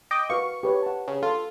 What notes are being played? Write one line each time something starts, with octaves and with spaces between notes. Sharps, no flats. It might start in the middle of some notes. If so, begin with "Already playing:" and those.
D#5 G5 D6
F#4 B4 F5 C#6
G4 B4 C#5
F#5 A5
C#3
F4 A4